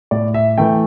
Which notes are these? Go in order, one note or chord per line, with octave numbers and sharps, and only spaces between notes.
A2 D5
E5
E3 A3 G5